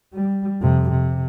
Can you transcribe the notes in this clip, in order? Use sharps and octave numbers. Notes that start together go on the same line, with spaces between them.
G3
F2 C3
C3